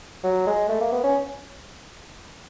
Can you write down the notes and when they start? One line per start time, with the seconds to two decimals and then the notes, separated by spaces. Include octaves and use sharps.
0.23 F#3
0.46 G#3
0.69 A3
0.80 A#3
0.92 B3
1.03 C#4